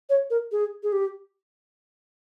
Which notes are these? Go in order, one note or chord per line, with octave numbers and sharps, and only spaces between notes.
C#5
A#4
G#4
G#4
G4